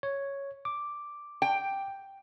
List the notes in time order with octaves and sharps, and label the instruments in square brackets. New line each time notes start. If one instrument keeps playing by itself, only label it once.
[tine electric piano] C#5
D6
[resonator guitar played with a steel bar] G5